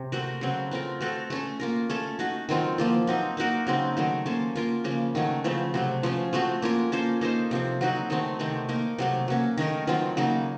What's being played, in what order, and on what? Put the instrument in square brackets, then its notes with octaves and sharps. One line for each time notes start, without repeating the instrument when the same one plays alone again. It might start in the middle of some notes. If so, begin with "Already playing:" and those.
Already playing: [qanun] C3
A3 C4 F#4 A#4
C#3 F#3 C4
A3 C4 F4 A#4
A3 C4 F#4 A4
A3 C#4 A4
A#3 F4 A#4
A3 C#4 A4
A3 D#4 F#4
D#3 F#3 C4 F4
F3 A#3 F4
F#3 C4 D#4
A#3 D#4 F#4 A#4
C#3 F#3 C4 D#4
D#3 F#3 A3
A#3 C#4 A4 C5
A#3 F4 A#4
C#3 F3 A#3 C#4
D#3 F#3 A3 C#4
C#3 F3 A3 C4
C3 F#3 A3
F3 A3 C#4
F3 A3 C4 F#4
A#3 C#4 F4 A#4
A#3 C#4 A4 C5
A#3 D#4 A4 C5
C3 F3 C4
F#3 C4 D#4 F#4
D#3 F#3 A3 C4
C3 D#3 A3 C4
A#3 D#4 A#4
C3 F#3 A3
F#3 A#3 C#4
D#3 A3 D#4 A#4
D#3 F#3 C4 F4
C#3 F#3 A#3 D#4